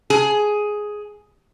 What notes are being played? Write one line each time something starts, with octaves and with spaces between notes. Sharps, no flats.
G#4